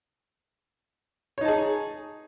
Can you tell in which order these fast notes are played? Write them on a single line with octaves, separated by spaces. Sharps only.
C#5 D#4 A5 G#4